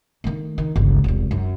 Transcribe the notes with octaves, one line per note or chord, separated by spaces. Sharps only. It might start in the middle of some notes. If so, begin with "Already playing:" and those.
D#3 A3
D#3
G1 C#2
E1 C2
F#2